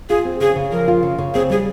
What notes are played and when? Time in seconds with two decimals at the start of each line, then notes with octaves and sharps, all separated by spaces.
0.09 F4 G#4
0.25 C4
0.40 C#3 G#4
0.56 C#3
0.72 F3 A#4
0.88 F4
1.03 C#3
1.18 C#3
1.34 C4 G#4
1.50 G3 G#4